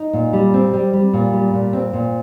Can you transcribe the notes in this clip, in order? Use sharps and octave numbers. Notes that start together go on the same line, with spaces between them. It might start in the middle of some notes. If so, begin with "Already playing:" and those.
Already playing: D#4
A#2
G3
C4
G3
G3
A#2
G3
A#2
C4
A#2